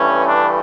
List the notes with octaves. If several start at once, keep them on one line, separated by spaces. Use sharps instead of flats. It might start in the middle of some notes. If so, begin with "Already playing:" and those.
Already playing: G2 E3 A3 C#4
D4